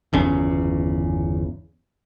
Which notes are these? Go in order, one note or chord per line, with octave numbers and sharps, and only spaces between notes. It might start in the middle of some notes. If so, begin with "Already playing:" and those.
G1 E2 C#3 C#4